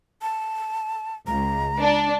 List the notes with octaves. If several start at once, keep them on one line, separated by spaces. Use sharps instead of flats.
A5
C#2 A#5
D4